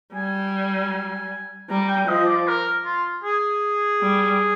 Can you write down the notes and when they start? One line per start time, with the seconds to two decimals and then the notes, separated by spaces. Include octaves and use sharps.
0.15 G3 G#5
1.70 G3 A#5
1.88 G5
2.08 F3 D#5
2.27 D5
2.47 A#4
2.85 F4
3.24 G#4
4.01 G3